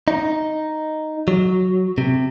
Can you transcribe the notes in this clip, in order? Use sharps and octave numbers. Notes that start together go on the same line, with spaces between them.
D#4
F#3
C3